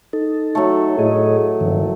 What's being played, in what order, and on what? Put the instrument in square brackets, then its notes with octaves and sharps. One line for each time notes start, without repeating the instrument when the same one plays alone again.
[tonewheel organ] D#4 A4
[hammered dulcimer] F#3 A3
[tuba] A2 [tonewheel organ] G#4 D#5
[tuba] F#1 [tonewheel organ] G2 D#3 F3